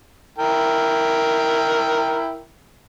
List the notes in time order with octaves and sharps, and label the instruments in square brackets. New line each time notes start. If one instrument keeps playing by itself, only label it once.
[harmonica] E4 A#4 G5